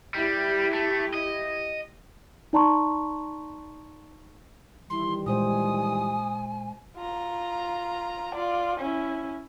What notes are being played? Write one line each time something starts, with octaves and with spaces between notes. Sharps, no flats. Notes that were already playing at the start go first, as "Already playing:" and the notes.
G3 E4 G4
A3
D#5
D#4 D5 A5 A#5 C6 C#6
D#3 E3 G3 E4 C6
A#2 G#3 C5 G#5 D#6
F4 A#5
F4 D5
C#4 E4